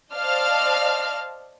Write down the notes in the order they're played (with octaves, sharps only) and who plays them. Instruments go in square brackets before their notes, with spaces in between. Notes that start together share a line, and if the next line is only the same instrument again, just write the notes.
[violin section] C5 D5 D#5 F5 A5 F6